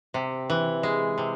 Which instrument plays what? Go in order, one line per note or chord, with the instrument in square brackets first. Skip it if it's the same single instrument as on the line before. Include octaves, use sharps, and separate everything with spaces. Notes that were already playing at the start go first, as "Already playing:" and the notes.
[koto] C3
E3
G#3
C3